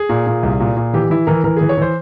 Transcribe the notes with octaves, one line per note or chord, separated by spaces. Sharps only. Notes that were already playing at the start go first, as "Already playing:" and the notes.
Already playing: G#4
A#2
A#2
C2
A#2
A#2
E3 G4
E3 E4
E3 A#4
E3 A#4
E3 G#4
C#5
E3 C5